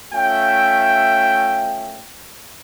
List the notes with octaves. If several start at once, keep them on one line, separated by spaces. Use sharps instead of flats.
A3 C#4 F4 E5 G5